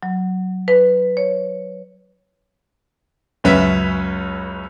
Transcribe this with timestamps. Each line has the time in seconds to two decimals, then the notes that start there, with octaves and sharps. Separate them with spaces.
0.03 F#3
0.68 B4
1.17 C#5
3.44 C#2 F#2 C#4 B4 E5 B6